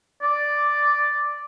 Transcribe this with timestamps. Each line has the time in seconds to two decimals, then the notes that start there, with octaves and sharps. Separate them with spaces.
0.22 D5